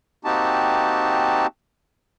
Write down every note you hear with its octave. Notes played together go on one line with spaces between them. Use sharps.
A#3 C4 D#4 F#4 G4 A5